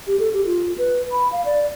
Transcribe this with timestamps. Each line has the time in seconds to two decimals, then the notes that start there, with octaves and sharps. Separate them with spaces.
0.07 G4
0.19 A4
0.33 G4
0.46 F4
0.78 B4
1.12 B5
1.32 F5
1.45 D5